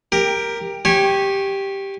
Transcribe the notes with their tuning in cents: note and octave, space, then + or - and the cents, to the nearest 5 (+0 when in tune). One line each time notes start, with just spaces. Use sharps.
G4 +15 A#4 +0
G4 +0 C#5 -20 G#5 +0